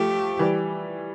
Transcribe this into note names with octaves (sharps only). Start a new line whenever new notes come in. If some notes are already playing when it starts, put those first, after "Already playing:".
Already playing: F3 A3 G4
E3 G3